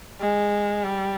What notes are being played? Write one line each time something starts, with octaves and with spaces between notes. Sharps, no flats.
G#3
G3